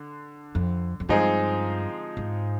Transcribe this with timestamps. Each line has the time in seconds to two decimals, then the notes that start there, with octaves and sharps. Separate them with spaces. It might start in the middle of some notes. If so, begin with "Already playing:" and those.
Already playing: D3
0.55 F2
1.00 F2
1.09 G2 F3 G#3 C4 D#4 G#4
2.17 G#2